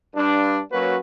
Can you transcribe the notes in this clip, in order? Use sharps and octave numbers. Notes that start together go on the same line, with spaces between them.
G2 D4
F#3 A#3 C#4 F#4 B4